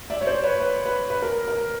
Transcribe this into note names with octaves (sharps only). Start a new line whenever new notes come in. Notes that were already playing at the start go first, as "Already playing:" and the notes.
D5 E5
C#5
C5 D5
B4 C#5
B4
B4
B4
A#4
A#4